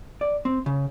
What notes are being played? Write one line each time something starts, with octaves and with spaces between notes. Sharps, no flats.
D5
C4
C#3